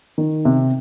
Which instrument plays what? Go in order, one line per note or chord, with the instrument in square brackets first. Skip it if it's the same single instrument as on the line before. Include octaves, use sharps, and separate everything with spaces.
[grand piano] D#3
C3